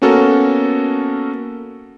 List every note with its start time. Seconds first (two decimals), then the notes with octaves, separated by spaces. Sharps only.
0.02 A#3 B3 C#4 F#4 A4 A#4